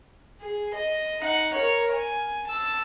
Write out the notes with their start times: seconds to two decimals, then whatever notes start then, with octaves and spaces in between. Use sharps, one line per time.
0.41 G#4
0.76 D#5
1.22 D#4 F#5
1.55 A#4 C#5
1.92 G#5
2.48 A5 E6